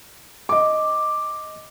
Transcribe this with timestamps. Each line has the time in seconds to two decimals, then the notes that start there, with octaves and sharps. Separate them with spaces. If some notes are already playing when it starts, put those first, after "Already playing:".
0.49 D#5 D6